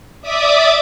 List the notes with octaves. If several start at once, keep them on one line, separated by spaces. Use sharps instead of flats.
D5 E5 D6 D#6